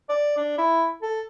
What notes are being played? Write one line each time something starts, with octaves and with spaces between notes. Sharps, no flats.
D5
D4
E4
A4